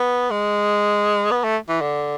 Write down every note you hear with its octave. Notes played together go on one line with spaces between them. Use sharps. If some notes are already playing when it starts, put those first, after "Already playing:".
Already playing: B3
G#3
B3
A3
E3
D3